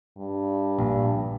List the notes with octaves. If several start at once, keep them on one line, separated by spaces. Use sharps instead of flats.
G2
A#1